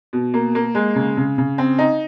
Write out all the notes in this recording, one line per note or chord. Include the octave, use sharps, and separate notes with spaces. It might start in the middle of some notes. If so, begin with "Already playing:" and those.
B2
A#3
A#3
G#3
C#3
C#3
C#3
C4
D#4